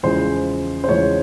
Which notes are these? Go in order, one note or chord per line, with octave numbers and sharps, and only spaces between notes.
E2 C#3 F3 G#3 C5
C5
E2 C#3 F3 G#3 C#5